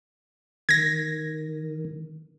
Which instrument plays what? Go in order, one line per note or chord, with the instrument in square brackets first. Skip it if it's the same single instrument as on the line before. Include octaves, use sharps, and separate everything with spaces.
[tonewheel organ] D#3 [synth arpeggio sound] G#6 A#6